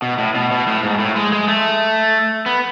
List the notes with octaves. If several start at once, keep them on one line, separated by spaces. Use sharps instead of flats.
B2
A2
B2
B2
A2
G#2
A2
G#3
G#3
A3
B3